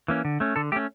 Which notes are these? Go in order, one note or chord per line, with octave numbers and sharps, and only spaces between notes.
E3 A#3 C#4
D3
A3 C#4
D3 A4
A3 C#4 G4